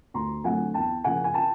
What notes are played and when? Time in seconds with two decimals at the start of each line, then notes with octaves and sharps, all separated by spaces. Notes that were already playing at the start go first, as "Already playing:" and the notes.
0.14 D2 A#5 C6
0.44 D3 F#3 A3 C4 F#5 G#5
0.74 E2 G5 A5
1.04 C#3 F3 A#3 F#5 G#5
1.24 G#5
1.34 G5 A5